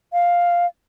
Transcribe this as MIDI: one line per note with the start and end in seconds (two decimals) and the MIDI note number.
0.13 0.66 77